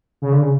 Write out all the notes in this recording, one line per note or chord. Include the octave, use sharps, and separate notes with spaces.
C#3
D3
C#3